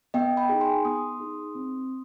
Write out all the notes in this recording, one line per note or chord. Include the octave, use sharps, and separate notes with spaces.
B3 D#5 G5
G5 B5
D#4 G#4
G#5 C6
B3 C6 D#6
D#4 G#4
C4